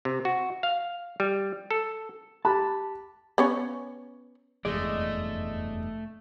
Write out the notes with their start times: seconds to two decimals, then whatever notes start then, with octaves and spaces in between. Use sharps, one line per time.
0.05 C3
0.25 F#4
0.63 F5
1.20 G3
1.71 A4
2.45 G4 A5 B5 F#6
3.38 B3 C#4 C#5
4.65 F1 E2 G2 G#3 A3 D5 D#5